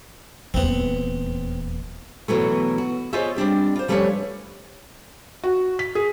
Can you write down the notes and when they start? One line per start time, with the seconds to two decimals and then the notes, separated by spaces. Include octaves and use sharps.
0.54 D#1 E2 B3 C4
2.28 B2 E3 F#3 A3
2.78 F#4
3.13 F4 G#4 C5 C#5 D#5 E5
3.36 G3 C4 D4 G4
3.76 F4 C5
3.88 F3 G3 A3 C#4 B4 C#5
5.44 F#4
5.79 B6
5.95 G#4